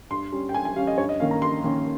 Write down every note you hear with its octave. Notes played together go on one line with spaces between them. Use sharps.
G2 C6
G3 C#4
G5
G2 G#5
G#5
G3 C#4 F5
D#5
G2 C#5
D#5
D#3 A#3 C#4 F5
A#5
G2 C6
D#3 A#3 C#4